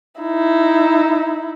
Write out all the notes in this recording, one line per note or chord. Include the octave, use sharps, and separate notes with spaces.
D#4 E4